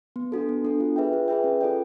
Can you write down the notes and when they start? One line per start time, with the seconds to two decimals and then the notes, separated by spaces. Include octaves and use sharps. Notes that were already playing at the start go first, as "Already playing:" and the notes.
0.16 B3
0.32 D4 F#4 A4
0.49 B3
0.65 D4 F#4 A4
0.80 F4
0.96 G#4 B4 E5 G5
1.13 F4
1.28 G#4 B4 E5 G5
1.44 C#4
1.61 F4 A4 D5 G5